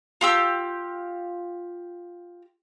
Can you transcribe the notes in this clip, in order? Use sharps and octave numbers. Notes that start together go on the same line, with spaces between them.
F4 G4 E6